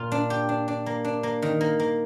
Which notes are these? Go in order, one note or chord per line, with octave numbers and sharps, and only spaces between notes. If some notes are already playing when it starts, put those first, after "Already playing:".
Already playing: A#2 F4
D4
G4
D4
D4
A#3
D4
A#3
D#3
A#3
A#3